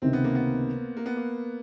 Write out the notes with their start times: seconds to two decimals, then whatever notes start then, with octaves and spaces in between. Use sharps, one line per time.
0.02 C#2 C3 D#3 C4
0.13 B3
0.24 A#3
0.35 B3
0.97 A#3
1.06 B3
1.16 A#3